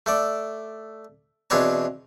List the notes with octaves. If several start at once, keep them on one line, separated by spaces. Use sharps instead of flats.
A3 A4 D5
E2 B2 C4 D4 C#5 A5